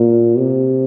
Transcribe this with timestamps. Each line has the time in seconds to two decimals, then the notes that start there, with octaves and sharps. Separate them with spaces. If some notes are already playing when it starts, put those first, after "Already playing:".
Already playing: A#2
0.38 C3